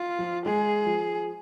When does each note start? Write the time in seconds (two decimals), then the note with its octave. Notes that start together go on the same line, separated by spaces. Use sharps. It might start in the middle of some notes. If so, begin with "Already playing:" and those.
Already playing: F4
0.19 F3
0.46 G#3 G#4
0.86 F3